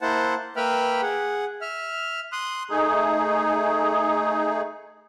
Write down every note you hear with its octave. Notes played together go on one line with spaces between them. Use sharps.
A#3 E4 C5 F#5 A5
A#3 B4 E5 G5 B5 F6
G#4 F#5
E5 F6
C6 D#6 F#6
A3 D#4 G#4